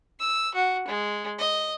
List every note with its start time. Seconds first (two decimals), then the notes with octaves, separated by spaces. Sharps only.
0.20 E6
0.55 F#4
0.88 G#3
1.39 D#5